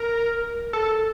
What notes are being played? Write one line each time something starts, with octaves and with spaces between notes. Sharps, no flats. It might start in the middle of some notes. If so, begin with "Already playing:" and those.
Already playing: A#4
A4